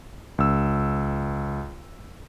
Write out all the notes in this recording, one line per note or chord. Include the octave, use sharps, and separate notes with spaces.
C#2 E6